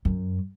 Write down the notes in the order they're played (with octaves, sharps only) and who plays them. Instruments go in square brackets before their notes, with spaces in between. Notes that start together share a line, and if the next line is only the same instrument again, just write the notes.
[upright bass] F#2